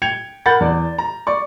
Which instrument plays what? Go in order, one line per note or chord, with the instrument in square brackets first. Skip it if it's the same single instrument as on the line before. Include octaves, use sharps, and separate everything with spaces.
[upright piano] G5 G#6 C#7 F7
A#4 F#5 B5 G6 A6
E2 D5
A#5
D5 C#6